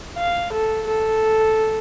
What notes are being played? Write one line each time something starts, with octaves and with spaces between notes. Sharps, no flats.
F5
A4
A4